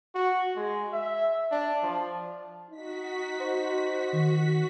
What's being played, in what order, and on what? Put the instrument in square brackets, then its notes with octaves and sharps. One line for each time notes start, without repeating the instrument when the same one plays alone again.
[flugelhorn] F#4
G#3
E5
D4
F3
[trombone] D#4 [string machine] F#4 B6
[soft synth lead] C5
D#3